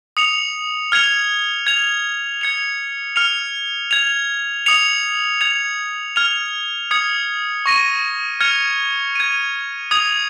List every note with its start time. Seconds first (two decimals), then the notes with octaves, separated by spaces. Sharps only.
0.17 D#6 C#7 F7
0.92 F6 G#6 C#7 F7
1.67 G#6 F7
2.41 G#6 C#7 F7
3.16 F6 C#7 F7
3.91 G#6 F7
4.66 D#6 C#7 F7
5.41 G#6 F7
6.16 F6 G#6 F7
6.91 D#6 G#6 C#7
7.66 C#6 A#6 D#7
8.40 F6 G#6 C#7 F7
9.15 G#6 D#7
9.91 D#6 G#6 F7